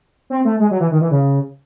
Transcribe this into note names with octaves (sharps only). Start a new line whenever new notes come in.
C4
A3
G#3
F#3
E3
D#3
E3
C#3